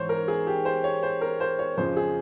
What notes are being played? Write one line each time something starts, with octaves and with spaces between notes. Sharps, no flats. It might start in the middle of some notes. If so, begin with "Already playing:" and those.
Already playing: G#2 E3 C5 C#5
A#4
G#4
G4
C5
C#5
C5
A#4
C5
C#5
F2 C#3 F3 C5
G#4